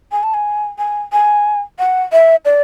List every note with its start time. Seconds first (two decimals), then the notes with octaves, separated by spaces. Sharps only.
0.12 G#5
0.23 A5
0.34 G#5
0.78 G#5
1.12 G#5
1.79 F#5
2.12 E5
2.45 D5